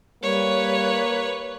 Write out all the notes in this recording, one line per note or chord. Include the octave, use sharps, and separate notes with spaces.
G3 A#3 B4 C#5